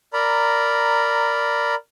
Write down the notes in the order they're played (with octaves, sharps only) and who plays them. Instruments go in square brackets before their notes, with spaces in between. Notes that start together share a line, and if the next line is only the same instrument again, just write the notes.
[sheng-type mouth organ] A#4 D5 A#5 B5